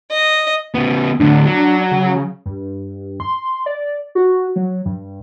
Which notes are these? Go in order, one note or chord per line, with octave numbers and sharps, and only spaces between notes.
D#5
C#3 B3
A2 D3 D4
F#3
C#3
G2
C6
D5
F#4
F#3
G2